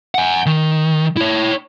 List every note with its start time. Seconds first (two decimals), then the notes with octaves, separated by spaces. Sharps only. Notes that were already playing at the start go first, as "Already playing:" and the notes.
0.15 F#5 G#5
0.46 D#3
1.17 E4 C#5